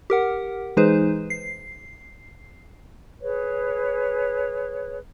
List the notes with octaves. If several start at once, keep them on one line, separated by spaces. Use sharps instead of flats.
G4 A#4 F#5
E3 G#3 D#4 G#4 B4 C5
C7
G#4 B4 C#5